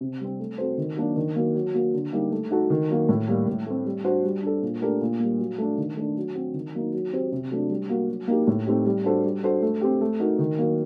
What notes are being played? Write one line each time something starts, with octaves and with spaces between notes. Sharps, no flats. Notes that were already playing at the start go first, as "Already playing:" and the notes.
C3
G3 C4
A3
C4 F#4 A4 C5
D#3
F#3 A#3 D4 F#4
D#3
F#3 A#3
F#3
A#3 F#4
D3
G3 A#3 D#4 G4
A3
D#4 F#4 A4
D#3
F#3 A#3 F#4
A2
G3 A#3
A2
A3 C4
G3
D4 F#4 C5
G3
D4 A4
A#2
A3 D4 G4 A#4
A#2
G3 A#3
F#3
A3 D4
D#3
A3 D4 A4
F#3
C4 F#4
D#3
F#3 A#3 D#4
F#3
C4 G4 C5
C3
F#3 A3 D4
G3
A#3 F#4
F#3
A#3 D#4 G4
A2
A3 C4 D#4 G4
G3
D4 F#4 A4 C5
G3
D4 F#4 A4 C5
A3
C4 G4
A3
D#4 F#4 A#4
D#3
F#3 A#3